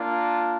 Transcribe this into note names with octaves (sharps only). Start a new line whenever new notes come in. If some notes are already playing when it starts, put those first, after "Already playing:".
Already playing: A#3 D4 F4